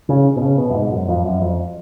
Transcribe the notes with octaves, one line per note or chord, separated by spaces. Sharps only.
C#3
B2
C#3
B2
F#2
G#2
F#2
F2
F#2
F2